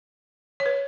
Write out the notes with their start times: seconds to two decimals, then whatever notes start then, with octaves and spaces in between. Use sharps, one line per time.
0.60 C#5
0.66 B4